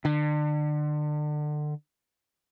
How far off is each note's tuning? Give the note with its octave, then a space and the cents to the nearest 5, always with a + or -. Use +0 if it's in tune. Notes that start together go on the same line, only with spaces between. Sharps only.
D3 +30